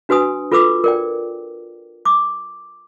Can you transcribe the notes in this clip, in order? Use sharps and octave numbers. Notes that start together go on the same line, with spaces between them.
D4 F#4 B4 G#5 D#6
F4 A4 B4 D6 E6
A#4 D5 G5
D6